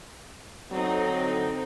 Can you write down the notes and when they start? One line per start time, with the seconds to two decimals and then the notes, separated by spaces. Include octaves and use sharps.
0.72 D3 F#3 C4 D#4